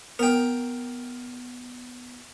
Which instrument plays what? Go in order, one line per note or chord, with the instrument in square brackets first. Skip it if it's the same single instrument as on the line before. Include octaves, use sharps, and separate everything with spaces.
[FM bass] B3 [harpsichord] A#4 G5